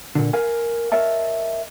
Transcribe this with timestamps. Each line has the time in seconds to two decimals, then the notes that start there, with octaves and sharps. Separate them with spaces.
0.15 A#2 D3
0.33 A#4 F5 G#5
0.92 A#4 C#5 D#5 E5 A5